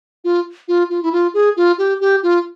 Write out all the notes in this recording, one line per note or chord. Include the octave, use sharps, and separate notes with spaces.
F4
F4
F4
E4
F4
G#4
F4
G4
G4
F4